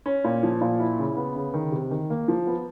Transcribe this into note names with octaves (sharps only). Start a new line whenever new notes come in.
C#4
A#2
F3
A#2
E4
C#3
B3
C#3
D#3
C3
D#3
A#3
F3
B3